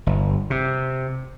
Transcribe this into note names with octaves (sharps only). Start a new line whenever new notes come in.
G1
C3